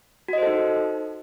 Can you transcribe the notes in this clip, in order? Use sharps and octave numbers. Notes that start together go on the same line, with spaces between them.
D#4 F#4 A4 C5 D#5